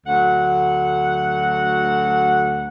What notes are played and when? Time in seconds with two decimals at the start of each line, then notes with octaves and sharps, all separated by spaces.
0.07 D2 F#3 F#5